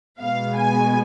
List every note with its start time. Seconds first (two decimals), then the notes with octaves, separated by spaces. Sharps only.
0.19 B2 G#3 B3 F5
0.56 G#5